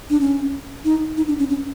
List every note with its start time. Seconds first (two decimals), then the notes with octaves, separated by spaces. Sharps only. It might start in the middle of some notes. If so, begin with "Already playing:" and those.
0.10 D4
0.21 C#4
0.85 D#4
1.17 D#4
1.28 D4
1.39 C#4
1.50 C#4